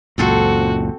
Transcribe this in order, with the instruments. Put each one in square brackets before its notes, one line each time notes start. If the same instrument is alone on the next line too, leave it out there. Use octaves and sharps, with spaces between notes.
[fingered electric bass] C#2 F#2 A#2 [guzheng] C4 A4 C5 [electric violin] F#4